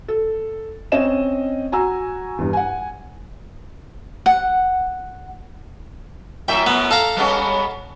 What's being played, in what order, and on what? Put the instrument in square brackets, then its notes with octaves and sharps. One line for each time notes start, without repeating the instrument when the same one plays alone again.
[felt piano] A4
C4 C#4 D#5 E7
F#4 G#5 A#5 E6
E2 G2
F#5 G#5
[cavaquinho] F#5
[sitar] F#2 A2 E5 [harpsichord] G5
[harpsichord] B3
A4 F5 A#5
[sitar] G3 B3 C#4